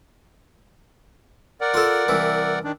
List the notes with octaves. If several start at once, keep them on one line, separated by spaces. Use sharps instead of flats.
A#4 D5 F#5
F4 A4
C2 E3
D#3 D4